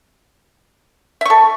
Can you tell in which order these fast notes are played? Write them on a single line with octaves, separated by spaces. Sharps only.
E5 C#6 A4